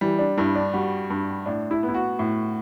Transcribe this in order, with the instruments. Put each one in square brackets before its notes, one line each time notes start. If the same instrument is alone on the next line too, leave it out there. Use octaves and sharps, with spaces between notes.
[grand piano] E3 [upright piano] G3
[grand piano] D4
[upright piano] G2 [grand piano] E4
[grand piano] D4
[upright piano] G3 [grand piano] F#4
[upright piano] G2
[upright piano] A2 [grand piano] D4
[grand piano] E4
[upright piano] B3
[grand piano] E4
F#4
[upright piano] A2